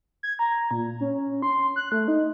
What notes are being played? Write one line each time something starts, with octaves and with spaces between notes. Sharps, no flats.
G#6
A#5
A#2
C#4
C6
F#6
A3
D#4